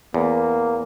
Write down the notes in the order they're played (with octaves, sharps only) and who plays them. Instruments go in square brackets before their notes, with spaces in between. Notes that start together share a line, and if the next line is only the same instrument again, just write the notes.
[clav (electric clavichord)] E2 [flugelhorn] A#3